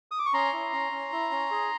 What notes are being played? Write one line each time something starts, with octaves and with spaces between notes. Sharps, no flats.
D#6
D6
C#6
C#4 A#5 C6
E4
C#4
C#4
E4
C#4
G#4